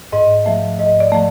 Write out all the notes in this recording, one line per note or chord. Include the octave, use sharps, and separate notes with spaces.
G#2 D#5
F3 A3 E5
G#2 D#5
D5
F3 A3